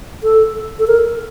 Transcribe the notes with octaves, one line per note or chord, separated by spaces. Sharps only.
A4
A4
A#4